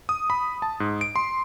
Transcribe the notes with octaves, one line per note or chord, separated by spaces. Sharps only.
D#6
B5
A5
G#2
D7
C6